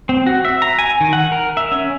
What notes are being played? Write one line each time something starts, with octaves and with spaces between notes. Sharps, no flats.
C4
F#4
E5
A#5
G#5
D#3
F#5
A#4
E5
C#4